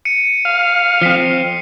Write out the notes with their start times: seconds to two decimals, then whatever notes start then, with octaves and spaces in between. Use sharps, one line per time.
0.05 C#7 D#7
0.45 F5
1.02 F3 C4 B6 C7